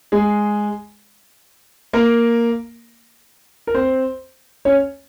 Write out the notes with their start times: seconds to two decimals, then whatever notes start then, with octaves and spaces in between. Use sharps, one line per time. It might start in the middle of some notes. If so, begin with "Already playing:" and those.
0.12 G#3 G#4
1.93 A#3 A#4
3.67 A#4
3.75 C4 C5
4.65 C#4 C#5